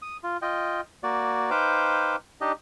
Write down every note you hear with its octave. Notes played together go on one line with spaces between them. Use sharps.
D#6
F4
F4 D#5 G5
A#3 F#4 D5
D#4 B4 C5 F5 G5 D6
D4 D#4 G4 D#5